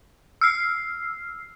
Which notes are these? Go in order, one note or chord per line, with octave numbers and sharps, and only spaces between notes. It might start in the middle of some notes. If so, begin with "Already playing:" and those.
E6 F6 C7